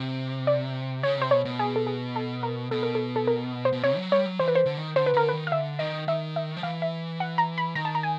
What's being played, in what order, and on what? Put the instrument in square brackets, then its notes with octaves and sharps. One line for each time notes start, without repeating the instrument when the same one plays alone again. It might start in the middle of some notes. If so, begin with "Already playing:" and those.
Already playing: [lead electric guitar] C3
[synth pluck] D5
[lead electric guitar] C#3 [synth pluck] C#5
[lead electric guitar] C3 [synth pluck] C5
[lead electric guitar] B2 [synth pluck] C#5
[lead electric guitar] B2
[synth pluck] G#4
A4
G#4
A4
A#4
[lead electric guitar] B2 [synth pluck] A4
[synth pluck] A#4
A4
A4
A#4
C5
[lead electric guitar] B2
[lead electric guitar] C3 [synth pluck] C#5
[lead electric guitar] F#3
[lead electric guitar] G3 [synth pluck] C#5
[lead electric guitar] F#3
[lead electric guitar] E3 [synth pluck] C5
[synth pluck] B4
C5
[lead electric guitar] D3
D#3
[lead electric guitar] D3 [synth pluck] C5
[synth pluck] B4
[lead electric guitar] D3 [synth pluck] A#4
[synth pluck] B4
[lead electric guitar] D#3
[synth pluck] F5
[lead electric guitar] D3 [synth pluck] E5
[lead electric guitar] D#3 [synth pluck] D#5
[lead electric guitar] D#3 [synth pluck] E5
[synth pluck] E5
[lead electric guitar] F3
[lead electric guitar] E3 [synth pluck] F5
[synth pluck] E5
F#5
A#5
B5
[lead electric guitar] D#3 [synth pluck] A#5
[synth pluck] A5
A#5
G#5